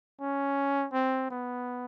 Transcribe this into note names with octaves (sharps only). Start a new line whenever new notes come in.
C#4
C4
B3